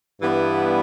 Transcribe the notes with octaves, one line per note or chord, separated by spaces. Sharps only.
G2 E3 G3 B3 E4